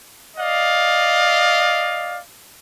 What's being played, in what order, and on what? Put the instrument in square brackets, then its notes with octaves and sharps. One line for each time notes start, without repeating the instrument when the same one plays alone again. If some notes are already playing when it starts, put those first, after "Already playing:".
[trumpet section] D5 D#5 F5